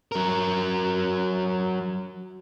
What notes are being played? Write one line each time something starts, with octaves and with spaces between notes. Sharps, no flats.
F#3 A#4